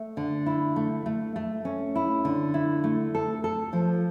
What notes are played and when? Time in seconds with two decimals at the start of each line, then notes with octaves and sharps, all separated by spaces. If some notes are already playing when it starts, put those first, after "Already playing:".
Already playing: A3
0.17 D3
0.46 E4
0.76 A3
1.06 A3
1.36 A3
1.65 C#4
1.96 E4
2.25 D3
2.54 E4
2.84 A3
3.15 A4
3.44 A4
3.73 F3